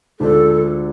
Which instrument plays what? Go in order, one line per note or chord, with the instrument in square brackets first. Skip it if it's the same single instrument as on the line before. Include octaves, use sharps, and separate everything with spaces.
[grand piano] D2 D3 G#3 D4 F4 [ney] A4